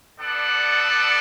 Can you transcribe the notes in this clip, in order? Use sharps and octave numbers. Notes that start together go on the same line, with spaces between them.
B3 D4 A4 D5 F#5